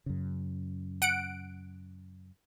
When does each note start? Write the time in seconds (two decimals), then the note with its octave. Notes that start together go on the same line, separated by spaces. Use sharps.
0.06 F#2 C#3
1.02 F#5 D7